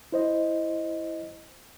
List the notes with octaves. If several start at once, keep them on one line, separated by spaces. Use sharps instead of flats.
E4 C5 D#5